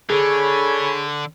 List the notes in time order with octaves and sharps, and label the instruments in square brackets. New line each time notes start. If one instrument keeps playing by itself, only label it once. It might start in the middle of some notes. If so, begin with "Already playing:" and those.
[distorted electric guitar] D3 [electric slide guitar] G#4 A4 [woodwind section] C#5 G#5 B5